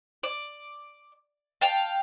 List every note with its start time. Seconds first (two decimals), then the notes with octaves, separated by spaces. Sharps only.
0.23 D5
1.61 F5 G5 A5